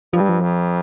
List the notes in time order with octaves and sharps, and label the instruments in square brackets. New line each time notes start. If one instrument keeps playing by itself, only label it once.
[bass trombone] G2 [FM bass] F3
[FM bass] G3
F3
[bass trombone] F2